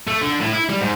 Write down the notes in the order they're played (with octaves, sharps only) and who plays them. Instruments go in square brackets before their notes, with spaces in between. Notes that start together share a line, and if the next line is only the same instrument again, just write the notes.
[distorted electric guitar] A3
D3
A2
E4
G3
G#2